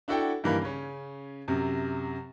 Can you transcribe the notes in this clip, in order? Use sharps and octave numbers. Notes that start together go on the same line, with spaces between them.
D4 E4 F#4 A4 F#5 G5
G2 D#3 E3 A#3 B5
C#3 C#4
F#2 C3